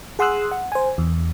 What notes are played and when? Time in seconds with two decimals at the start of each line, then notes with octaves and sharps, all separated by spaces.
0.19 G#4 F#5 C6 D#6 E6 F#6
0.52 F#5
0.72 C5 G#5
0.98 E2